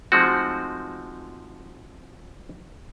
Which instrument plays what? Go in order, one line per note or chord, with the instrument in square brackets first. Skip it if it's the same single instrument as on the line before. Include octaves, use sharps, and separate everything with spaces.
[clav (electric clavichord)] F3 G#3 A3 C4 D#4 F#4